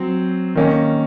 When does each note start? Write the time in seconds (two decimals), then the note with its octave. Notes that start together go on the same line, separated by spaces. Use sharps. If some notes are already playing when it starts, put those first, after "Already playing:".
Already playing: F#3 C4 C5
0.55 D#3 A#3 C#4